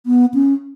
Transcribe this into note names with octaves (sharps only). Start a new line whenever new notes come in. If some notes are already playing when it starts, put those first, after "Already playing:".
B3
C#4